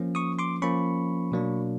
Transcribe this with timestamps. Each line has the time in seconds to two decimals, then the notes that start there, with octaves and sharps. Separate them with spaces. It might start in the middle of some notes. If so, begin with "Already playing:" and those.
Already playing: F3 A#3 C#4
0.15 C#6 D#6
0.39 C6 D6
0.62 F3 A#3 C#4 B5 C#6
1.32 B2 F#3 A#3 D4